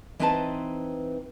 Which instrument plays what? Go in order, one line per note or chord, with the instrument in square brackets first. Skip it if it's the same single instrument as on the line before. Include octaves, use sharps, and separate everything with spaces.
[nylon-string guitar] E3 C4 D#4 B4 C5 A5